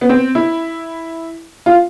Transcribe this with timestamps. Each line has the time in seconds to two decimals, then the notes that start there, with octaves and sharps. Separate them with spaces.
0.01 B3
0.09 C4
0.35 E4
1.66 F4